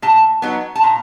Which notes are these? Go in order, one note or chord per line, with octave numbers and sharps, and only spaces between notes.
A#2 A5
F#3 B3 D#4
A5
A#2 A#5